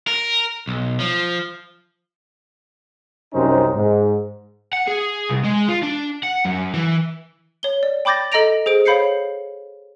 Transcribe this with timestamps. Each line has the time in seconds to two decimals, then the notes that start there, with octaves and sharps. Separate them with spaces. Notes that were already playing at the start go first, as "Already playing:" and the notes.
0.07 A#4
0.68 B1
1.00 F3
3.34 C2 F#2 C3 C#4 D#4 C5
3.75 G#2
4.73 F#5
4.88 G#4
5.30 C2
5.45 G#3
5.69 F4
5.83 D4
6.23 F#5
6.45 F#2
6.74 E3
7.63 C#5 G7
7.83 D5
8.05 G5 B5 D6 G6 A6 A#6
8.32 A4 D#5 A#5 A#6 D7 F7
8.66 G#4 C5 D7
8.85 C#5 F5 B5 G6 C7 C#7